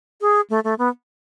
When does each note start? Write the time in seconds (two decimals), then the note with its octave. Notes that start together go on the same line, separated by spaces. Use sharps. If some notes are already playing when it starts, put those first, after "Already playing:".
0.21 G#4
0.50 A3
0.64 A3
0.78 B3